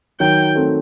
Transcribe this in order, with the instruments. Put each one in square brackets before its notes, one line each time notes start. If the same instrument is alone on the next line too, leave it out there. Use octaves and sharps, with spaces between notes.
[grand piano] D#3 F#3 [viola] G5
[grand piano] A3 C4